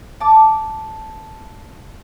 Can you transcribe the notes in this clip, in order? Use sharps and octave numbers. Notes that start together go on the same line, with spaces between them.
A5 D6